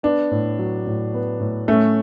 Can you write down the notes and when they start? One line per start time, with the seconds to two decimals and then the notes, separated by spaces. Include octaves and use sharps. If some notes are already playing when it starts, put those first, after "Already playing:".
0.03 B3 D4
0.31 A2
0.59 F#3
0.87 A2
1.14 B3
1.40 A2
1.68 A3 C#4